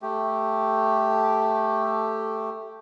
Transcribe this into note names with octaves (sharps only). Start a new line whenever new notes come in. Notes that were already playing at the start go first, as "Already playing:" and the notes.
A3 G4